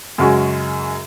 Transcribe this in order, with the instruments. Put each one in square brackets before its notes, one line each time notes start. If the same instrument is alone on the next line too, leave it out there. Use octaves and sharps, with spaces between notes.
[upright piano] F#2 C#3 G#3 C#4 F#4